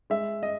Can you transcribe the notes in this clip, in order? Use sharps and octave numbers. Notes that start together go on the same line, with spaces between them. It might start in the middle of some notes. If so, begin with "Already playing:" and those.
G#3 E5
D#5